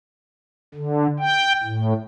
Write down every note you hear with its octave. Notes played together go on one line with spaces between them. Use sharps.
D3
G5
A2